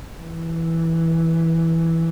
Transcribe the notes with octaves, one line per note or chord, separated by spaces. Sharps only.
E3